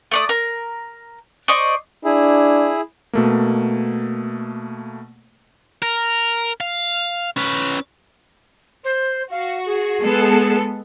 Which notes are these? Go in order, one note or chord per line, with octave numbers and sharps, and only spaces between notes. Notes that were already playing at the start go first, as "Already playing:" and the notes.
A3 D5 D#6
A#4
C5 D5 D#5 C#6
D4 E4 G#4
B2 A3 A#3
A#4
F5
C#4 B4
C5
F#4 F5
G#4
G#3 B3 A4